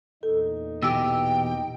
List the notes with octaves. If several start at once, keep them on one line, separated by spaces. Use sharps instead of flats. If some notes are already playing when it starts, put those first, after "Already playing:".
E2 A#2 D#4 A4
B2 E3 G4 G5 E6